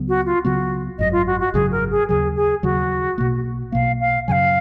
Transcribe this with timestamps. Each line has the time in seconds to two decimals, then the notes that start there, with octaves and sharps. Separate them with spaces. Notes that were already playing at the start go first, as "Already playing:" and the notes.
Already playing: C#2 C#3 F#3 B3
0.08 F#4
0.26 F4
0.44 C#2 C#3 F#3 B3 F#4
0.99 G#1 F#2 C#3 F#3 D#5
1.12 F4
1.27 F#4
1.40 F#4
1.53 G#1 F#2 C#3 F#3 G#4
1.71 A#4
1.91 G#4
2.09 D#2 C#3 F#3 G#4
2.36 G#4
2.63 D#2 C#3 F#3 F#4
3.18 B1 B2 A#3
3.72 B1 B2 A#3 F5
4.00 F5
4.27 F#2 C#3 F#3 F5 G#5